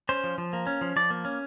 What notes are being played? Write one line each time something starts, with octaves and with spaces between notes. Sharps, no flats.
C#4 C5
F3
F3
A#3
C#4
F3
F3 D5
A#3
C#4